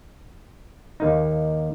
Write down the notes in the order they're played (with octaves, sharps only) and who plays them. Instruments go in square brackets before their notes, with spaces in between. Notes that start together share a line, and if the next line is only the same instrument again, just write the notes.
[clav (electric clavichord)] D#2 A#3 D#4